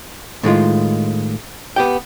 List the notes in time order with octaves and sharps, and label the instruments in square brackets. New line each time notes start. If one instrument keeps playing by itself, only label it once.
[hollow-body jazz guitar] A2 D#3 G#3 F4
B3 G4 G5